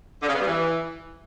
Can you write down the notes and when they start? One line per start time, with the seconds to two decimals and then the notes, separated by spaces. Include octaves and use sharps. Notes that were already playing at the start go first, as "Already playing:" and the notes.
0.22 D3
0.29 C#3
0.35 B3
0.41 G2
0.47 E3